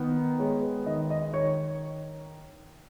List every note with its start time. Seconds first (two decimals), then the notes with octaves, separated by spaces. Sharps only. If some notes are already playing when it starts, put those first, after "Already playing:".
Already playing: D#3 B3
0.39 G#3 C#5
0.63 B4
0.86 D#3 D#5
1.10 D#5
1.33 D#3 C#5